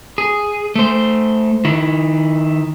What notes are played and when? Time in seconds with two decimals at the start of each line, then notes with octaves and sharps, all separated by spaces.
0.18 G#4
0.75 A3 C5
1.65 D#3 E4